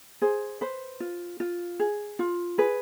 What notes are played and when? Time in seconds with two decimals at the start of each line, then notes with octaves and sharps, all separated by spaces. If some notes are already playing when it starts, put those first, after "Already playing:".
0.22 G#4 C5
0.61 B4 C5
1.00 F4
1.40 F4
1.80 G#4
2.19 F4
2.58 G#4 B4